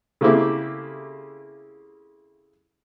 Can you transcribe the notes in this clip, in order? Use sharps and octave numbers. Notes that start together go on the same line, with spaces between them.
C#3 A3 A#3 C4 E4 G4